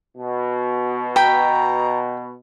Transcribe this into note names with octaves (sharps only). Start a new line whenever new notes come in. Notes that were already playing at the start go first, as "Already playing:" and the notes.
B2
G5 A#5 B5